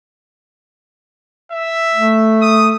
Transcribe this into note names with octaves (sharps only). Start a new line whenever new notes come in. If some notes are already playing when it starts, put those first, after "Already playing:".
E5
A3
D#6